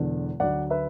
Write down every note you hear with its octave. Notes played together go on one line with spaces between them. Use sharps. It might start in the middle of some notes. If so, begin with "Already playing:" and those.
Already playing: E1 E2 D3
D2 D3 F#3 D5 F#5
B4 E5